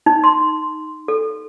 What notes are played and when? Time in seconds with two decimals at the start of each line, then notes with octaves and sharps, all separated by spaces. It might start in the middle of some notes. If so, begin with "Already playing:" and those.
0.06 D#4
0.24 C6
1.08 A4